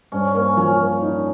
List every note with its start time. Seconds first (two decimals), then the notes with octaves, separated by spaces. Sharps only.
0.12 G2 C#4
0.34 A#3 C#4
0.57 F3 C#4
0.80 A#3
1.02 D#4